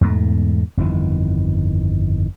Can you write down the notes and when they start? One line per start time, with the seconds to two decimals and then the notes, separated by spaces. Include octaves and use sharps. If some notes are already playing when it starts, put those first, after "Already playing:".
0.01 E2 G#2 B2 A3
0.77 G1 F2 D#3 E3